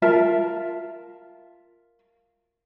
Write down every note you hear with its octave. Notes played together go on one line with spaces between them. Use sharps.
F4 A#4 E5 A5